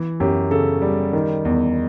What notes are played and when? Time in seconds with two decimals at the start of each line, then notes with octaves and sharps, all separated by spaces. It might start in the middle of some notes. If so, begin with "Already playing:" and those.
Already playing: E3
0.20 F#2 G4
0.51 C#3 A4
0.82 G3
1.13 D#3
1.45 E2